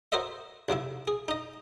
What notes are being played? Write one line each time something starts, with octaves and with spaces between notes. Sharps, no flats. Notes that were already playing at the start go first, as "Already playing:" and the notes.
F#4 A#4 C5 C#5 D#5 E5
B1 C3 F3 E4
G#4
D#4 D#5